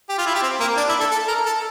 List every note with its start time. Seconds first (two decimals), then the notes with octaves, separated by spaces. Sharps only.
0.09 G4
0.18 F4
0.26 E4
0.35 G4
0.43 C4
0.60 A#3
0.77 D4
0.89 E4
1.00 A4
1.11 A4
1.28 A#4
1.46 A4